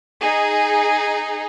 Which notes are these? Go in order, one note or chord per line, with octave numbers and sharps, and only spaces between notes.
D#4 G#4